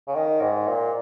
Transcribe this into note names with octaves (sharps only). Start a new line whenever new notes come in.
C#3
D#3
G#2
A#2